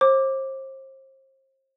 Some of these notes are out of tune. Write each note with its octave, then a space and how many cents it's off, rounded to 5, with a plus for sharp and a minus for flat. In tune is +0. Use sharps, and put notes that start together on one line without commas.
C5 +35 D6 +0